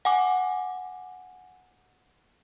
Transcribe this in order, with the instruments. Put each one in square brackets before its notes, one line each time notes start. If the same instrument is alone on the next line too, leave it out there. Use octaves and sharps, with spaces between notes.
[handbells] F#5 G#5 D6